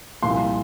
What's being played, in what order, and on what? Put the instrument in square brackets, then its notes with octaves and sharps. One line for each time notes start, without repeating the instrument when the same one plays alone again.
[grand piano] C2 A#2 F3 [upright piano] C6